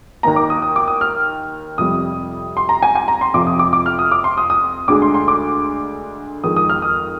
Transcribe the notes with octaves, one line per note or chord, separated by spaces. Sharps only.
D#2 D#3 A#3 D#4 A#5
D6
D#6
D#6
D6
D#6
F6
F2 C3 G3 D#6
C6
A#5
G#5
G#5
A#5
C6
F2 C3 F3 D6
D#6
D6
D6
F6
D#6
D6
C6
D#6
D#6
D2 D3 G#3 D4 D6
C6
C6
D6
F2 D#3 G#3 D#6
D#6
F6
D#6